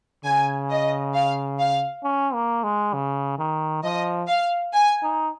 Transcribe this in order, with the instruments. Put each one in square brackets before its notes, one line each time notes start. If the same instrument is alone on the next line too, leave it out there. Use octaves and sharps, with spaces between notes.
[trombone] C#3 [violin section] G#5
[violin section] D#5
F5
F5
[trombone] C#4
A#3
G#3
C#3
D#3
[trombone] F3 [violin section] D#5
[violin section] F5
G#5
[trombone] D#4